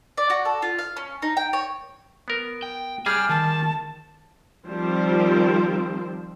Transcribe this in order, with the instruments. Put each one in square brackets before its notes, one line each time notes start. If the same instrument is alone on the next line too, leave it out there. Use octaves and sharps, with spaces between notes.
[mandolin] D5
F#4
A4
F4
F5
C#4
D#4
G5
C#5
[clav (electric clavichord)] B3 A#4
[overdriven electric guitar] G5
[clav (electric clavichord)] G3 G#4 [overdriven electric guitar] F5 G#5 [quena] F6
[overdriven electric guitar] D#3 [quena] A5
[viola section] D#3 F3 G3 C4 C5